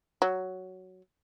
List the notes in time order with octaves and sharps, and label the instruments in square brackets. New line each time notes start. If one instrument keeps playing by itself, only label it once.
[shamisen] F#3